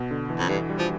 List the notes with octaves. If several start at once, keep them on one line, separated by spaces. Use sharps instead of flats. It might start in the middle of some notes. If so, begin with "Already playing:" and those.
Already playing: B2
D3
E3
F2
G2 E3
G3
F3